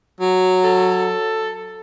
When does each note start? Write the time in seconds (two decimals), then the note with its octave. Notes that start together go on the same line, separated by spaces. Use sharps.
0.20 F#3
0.64 A4